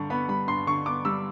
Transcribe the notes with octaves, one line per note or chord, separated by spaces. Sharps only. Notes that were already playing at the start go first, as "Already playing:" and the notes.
Already playing: G2 D3 G3 C#6
B3 B5
G3 B5
G2 C6
D3 C#6
B3 D6
G3 E6